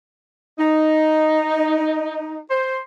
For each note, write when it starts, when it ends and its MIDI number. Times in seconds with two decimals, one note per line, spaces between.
0.59 2.39 63
2.50 2.80 72